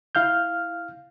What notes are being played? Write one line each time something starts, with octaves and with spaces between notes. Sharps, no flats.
E4 F5 F6 G6